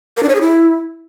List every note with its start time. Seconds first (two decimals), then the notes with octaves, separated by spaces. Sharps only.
0.17 A#4
0.23 D4
0.29 C#5
0.35 G#4
0.41 E4